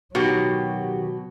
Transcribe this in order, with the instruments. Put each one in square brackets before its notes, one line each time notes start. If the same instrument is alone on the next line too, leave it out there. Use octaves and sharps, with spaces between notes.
[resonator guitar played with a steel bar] B2 [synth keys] D#3 F#4 G4 [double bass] F#3